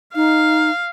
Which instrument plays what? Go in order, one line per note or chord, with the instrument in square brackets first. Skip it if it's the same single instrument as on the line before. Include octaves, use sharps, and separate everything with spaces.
[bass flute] D#4 [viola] F5